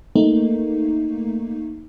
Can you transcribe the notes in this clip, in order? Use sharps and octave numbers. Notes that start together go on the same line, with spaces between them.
A3 A#3 D#4